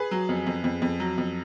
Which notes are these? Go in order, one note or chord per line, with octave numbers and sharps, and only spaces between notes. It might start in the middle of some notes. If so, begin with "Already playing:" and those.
Already playing: G#4 B4
F#3
F2
F2
F2
F2
F#3
F2